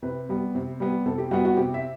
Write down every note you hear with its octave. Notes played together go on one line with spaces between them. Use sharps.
C3 B4
G3 B3
C3
G3 B3
C3 A4
G4
G3 B3 F#4
F#4
C3 G4
E5